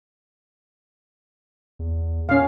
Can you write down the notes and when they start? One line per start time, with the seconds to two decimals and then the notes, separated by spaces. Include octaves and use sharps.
1.79 E2
2.29 A#2 C#4 F5